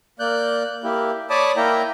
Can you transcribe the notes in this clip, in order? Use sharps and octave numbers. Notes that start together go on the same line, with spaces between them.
A#3 D5 F#6 G6
A#3 E4 G4
C#5 D5 A5 B5 D6 D#6
A#3 E4 G5 A#5